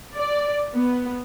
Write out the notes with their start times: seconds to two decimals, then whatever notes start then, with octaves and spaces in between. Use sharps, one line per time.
0.14 D5
0.73 B3